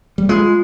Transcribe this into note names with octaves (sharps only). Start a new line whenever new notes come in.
G3
G#3 F4